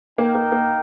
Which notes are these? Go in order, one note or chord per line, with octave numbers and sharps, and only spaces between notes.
A#3 D#4 A#4 G5
A#3
A#3